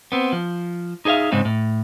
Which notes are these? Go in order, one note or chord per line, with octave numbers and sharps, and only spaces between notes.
B3 C4
F3
D#4 G#4 C5 E5 F5
G#2 C#3 G#3 C4 D#4
A2